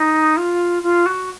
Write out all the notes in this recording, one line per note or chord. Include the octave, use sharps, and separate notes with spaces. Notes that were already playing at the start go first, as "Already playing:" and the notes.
Already playing: D#4
F4
F4
F#4